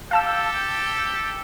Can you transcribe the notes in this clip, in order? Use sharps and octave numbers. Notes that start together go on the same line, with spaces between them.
G4 A4 F5 G5 A5 E6